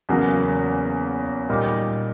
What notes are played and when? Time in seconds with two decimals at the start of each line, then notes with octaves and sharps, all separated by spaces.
0.09 E2 C#3 F#3 A#3
1.49 A#2 G3 A#3 D#4